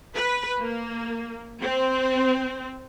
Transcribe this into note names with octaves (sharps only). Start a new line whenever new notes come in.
B4
A#3
C4